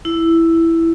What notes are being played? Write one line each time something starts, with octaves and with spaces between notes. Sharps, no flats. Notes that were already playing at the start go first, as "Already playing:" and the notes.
E4